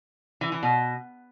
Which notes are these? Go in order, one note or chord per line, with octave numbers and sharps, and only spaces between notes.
E3
E3
B2